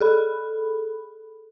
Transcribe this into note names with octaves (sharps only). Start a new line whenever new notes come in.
G#4 A4 B5